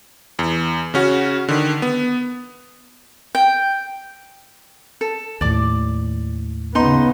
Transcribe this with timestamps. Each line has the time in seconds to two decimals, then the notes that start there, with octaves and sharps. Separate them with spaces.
0.39 E2
0.94 C#3 C#4 F#4
1.48 D3 D#3
1.82 B3
3.35 G5
5.01 A4
5.41 D#2 A2 D5 D6
6.75 C#3 B3 D#4 D#5 C6